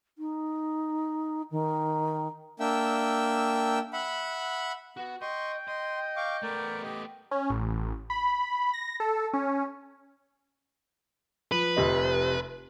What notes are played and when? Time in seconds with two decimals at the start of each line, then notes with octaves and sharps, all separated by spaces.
0.18 D#4
1.51 D#3
2.60 A#3 D4 E5 G5 E6
3.93 E5 F#5 B5
4.97 B3 F#4
5.22 D#5 G5 C6 C#6
5.68 D#5 C6
6.16 F5 C#6 D6
6.43 A3 B3 A#4 D5
6.82 G4 D#5
7.31 C#4
7.50 A1
8.10 B5
8.73 A#6
9.00 A4
9.34 C#4
11.52 F3 B4
11.76 F1 C3 D#5